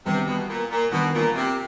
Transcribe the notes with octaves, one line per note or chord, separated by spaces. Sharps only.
C3 D#3 G3 B3 D4 F#4
B2
A#2
A#2
B2 D#3 G3 B3 D4 F#4
A#2
C3